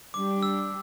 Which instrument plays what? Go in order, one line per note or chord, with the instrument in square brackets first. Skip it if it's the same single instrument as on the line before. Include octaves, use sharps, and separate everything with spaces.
[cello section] G3 D4 G4 [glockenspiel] D6
[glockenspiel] E6